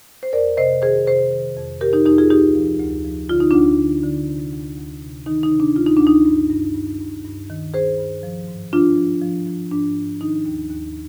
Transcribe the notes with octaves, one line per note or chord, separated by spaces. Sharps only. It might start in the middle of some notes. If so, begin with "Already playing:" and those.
C5
F2 A#4 D5
C3 C5 D#5
D#3 G#4 C5
C3 G#4 C5
D#3
F2
C3 G4 A#4
D#4 G4
F2 D#4 G4
F4 G#4
D2 D#4 G4
F3
D2
F3
D3 F4
D#4
D2 D4 F4
D3
D3
C3
D2
D2
C3
D#3 D#4
D#4
C3
D4
D2 F4
D#4
D2 D4
D#4
G2
G2
G2
G2
G2
D#3
D#3 G#4 C5
G2
F3
G#2
F3 D4 F4
F3
F3
F3
G#2 D4
G#2
D#3 D#4
D#2
D#2